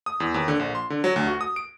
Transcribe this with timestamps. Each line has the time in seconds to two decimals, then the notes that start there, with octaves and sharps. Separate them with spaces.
0.06 D#6
0.20 E2
0.34 D#2
0.48 D3
0.59 A#1
0.75 C6
0.90 D3
1.04 F#3
1.16 D2
1.27 F#4
1.41 D#6
1.56 D7